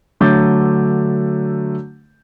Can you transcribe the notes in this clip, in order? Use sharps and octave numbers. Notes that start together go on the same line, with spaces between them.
D3 F#3 A3 D6 G6 A6